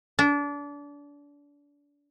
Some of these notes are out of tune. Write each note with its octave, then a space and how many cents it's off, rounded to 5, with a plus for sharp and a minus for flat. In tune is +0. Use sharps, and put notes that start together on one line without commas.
D4 -30